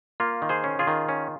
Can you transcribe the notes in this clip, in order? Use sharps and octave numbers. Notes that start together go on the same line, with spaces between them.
A#3 F4
D#3
G#4 C5
C#4
F4 G#4
D#3
C#4